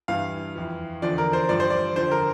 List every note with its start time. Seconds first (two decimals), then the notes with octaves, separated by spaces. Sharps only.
0.08 G2 E3 F5
0.55 F2 E3
1.02 E2 D3 F3 D5
1.18 A#4
1.33 C5
1.49 G2 F3 D5
1.60 C5
1.70 D5
1.96 F2 D3 F3 C5
2.11 A#4